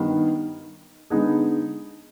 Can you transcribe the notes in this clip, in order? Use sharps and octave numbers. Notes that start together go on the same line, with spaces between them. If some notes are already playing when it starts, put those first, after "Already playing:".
Already playing: G2 D#3 B3
D3 G#3 B3 D#4 G#4